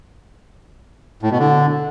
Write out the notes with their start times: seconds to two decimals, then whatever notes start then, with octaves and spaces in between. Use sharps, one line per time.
1.23 A2
1.31 B2
1.39 D3